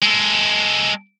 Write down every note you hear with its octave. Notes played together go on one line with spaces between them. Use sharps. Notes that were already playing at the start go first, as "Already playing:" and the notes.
G#3 A4